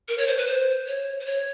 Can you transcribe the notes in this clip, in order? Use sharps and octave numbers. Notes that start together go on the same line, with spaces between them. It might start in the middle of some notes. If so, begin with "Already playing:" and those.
A#4
C#5
C5
B4
C5
C#5
C5
C#5